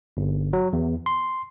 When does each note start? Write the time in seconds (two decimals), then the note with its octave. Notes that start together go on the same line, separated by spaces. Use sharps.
0.17 G1
0.53 F#3
0.73 E2
1.06 C6